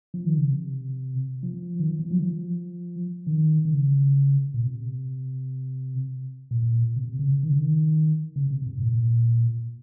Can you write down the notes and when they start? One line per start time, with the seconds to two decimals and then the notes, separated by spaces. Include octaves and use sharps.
0.14 F3
0.26 D#3
0.38 C#3
0.50 C3
1.43 F3
1.80 D#3
1.89 F3
2.00 F3
2.11 F#3
2.19 D#3
2.23 F3
3.27 D#3
3.65 D#3
3.73 C#3
4.54 A#2
4.66 C3
6.51 A#2
6.96 C3
7.19 C#3
7.43 D#3
7.51 C#3
7.59 D#3
8.36 C#3
8.51 C3
8.66 G#2
8.82 A#2